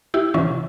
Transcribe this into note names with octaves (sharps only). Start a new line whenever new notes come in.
E4 G4
C3 E3 C#4 F4